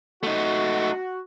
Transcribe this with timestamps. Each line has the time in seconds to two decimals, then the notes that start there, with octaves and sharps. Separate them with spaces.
0.23 A3 D#4 F#4